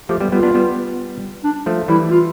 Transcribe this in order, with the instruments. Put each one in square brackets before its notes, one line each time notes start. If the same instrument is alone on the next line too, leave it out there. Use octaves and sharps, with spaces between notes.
[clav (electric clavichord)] F3 A3 [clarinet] G4
[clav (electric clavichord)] G3 B3
[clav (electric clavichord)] G3 B3 [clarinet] F4
[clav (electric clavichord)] B3 D4
G3 B3
[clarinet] D4
[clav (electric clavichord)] F3 A3
[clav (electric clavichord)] E3 G3 [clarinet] E4
[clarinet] F4